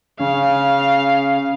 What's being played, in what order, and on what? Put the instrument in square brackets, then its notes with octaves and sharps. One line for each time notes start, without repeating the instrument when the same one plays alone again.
[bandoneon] C#3 [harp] C#4 [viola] F5